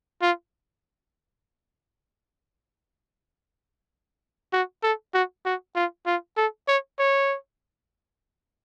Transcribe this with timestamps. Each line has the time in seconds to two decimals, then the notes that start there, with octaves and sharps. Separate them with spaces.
0.22 F4
4.53 F#4
4.83 A4
5.14 F#4
5.45 F#4
5.76 F4
6.06 F4
6.37 A4
6.68 C#5
6.99 C#5